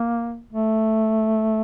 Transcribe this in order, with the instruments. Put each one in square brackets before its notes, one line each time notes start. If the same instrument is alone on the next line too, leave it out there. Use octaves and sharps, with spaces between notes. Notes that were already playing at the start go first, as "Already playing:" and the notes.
Already playing: [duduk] A#3
A3